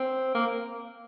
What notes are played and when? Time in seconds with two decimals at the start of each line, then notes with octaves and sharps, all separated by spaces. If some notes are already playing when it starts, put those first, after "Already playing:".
Already playing: C4
0.35 A#3